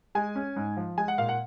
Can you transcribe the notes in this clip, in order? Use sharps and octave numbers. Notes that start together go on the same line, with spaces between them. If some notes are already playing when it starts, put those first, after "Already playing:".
G#3 G#5
C#4
G#2
F3
G#3 G#5
F#5
A#2 F5
F#5